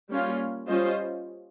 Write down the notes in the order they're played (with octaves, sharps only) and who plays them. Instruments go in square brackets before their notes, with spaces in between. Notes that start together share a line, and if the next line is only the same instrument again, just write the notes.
[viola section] G3 A#3 C#4 F4
G3 C#4 F4 C5 D#5